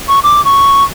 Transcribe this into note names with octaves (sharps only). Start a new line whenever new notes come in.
C#6
D6
C#6